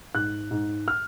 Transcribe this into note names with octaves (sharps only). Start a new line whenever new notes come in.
G#2 F#6
G#2
F6